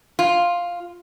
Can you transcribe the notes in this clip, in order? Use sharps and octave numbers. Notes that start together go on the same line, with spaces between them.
F4